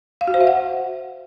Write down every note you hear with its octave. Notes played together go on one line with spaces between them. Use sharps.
F5
F#4
C5
E5
F#5